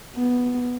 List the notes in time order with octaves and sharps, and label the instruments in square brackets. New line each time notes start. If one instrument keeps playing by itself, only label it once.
[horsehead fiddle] B3